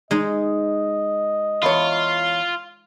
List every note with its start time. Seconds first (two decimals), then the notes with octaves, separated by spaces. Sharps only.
0.11 G#3 D#4 D#5
1.63 E2 F4 C#5